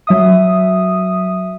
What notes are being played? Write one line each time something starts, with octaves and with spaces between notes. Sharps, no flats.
F#3 E5 D#6